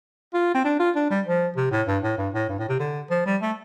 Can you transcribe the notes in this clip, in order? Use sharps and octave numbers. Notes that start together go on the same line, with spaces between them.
F4
C4
D4
F4
D4
G3
F3
C3
A2
G2
A2
G2
A2
G2
A2
C3
D3
F3
G3
A3